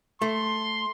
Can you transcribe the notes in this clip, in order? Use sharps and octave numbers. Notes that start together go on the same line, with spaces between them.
A3 C6